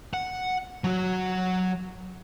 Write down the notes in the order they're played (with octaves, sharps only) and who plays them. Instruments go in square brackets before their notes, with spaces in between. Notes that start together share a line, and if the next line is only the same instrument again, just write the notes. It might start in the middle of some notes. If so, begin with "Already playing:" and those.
[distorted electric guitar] F#5
F#3 F#4